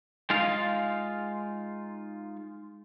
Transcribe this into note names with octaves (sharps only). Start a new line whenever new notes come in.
G#3 D#4 F4 F5